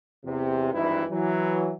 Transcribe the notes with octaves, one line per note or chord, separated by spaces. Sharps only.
E2 C3
G#1 G2 E3 D#4 E4 B4
E3 F#3